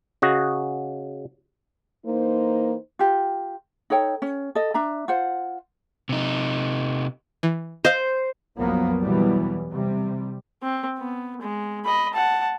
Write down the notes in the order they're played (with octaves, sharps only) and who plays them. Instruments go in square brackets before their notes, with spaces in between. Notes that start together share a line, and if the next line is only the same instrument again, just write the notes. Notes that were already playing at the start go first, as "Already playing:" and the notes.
[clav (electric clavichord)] C#3 F#4 D#5
[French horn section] E3 D#4 C5 [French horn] A#3
[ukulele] F4 G4
D#4 A4 C#5 G5
C#4
A4 D#5
D4 E5 A#5
F4 C5 F#5
[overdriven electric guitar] C3 D#4
[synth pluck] E3
[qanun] C5 [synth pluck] D#5 F5
[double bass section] C2 F#2 F3 F#3 A#3 B3
E2 B2 E3 F#3 G3 B3
C3 G3
[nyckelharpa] C4
B3
G#3
D#5 B5
F#5 A5